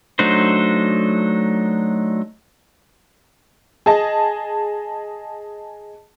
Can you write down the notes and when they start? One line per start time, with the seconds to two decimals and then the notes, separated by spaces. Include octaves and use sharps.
0.19 F#3 A3 D4 D#4 C5
3.86 G#4 D#5 A5